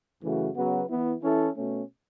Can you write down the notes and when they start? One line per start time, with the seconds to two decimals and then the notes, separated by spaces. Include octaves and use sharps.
0.22 F#2 C#3 E3 A3 F#4
0.55 C#3 F#3 B3 F#4 B4
0.88 E3 B3 E4
1.21 E3 C#4 E4 A4
1.55 B2 A3 C#4